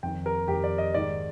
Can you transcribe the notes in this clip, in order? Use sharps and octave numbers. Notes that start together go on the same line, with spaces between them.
F2 D#3 G5
A#4
F2 D#3 G4
D5
D#5
G#2 D#3 D5